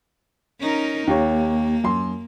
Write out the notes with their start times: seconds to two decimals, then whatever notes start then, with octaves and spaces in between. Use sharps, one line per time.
0.59 C#4 D#4 A#4
1.07 D#2 A#3 G4 C#5
1.84 F#2 C6